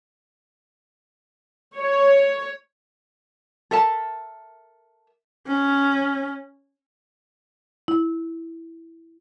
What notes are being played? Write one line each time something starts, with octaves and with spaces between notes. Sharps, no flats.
C#5
A4 A#4 E5 A5
C#4
E4